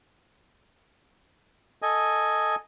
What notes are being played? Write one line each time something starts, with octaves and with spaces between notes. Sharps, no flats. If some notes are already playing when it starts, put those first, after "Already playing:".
A4 D#5 G#5